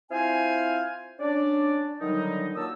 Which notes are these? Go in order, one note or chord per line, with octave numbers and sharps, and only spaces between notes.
C4 E4 F4 C5 F5 G#5
C#4 D4 D5
D3 D#3 F#3 G3 D#4
A#2 F#3 A#3 A5 D#6 E6